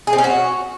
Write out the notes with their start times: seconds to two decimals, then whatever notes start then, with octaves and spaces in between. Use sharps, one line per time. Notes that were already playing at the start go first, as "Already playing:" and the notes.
0.07 G#4
0.13 C4
0.18 C#4
0.24 F#4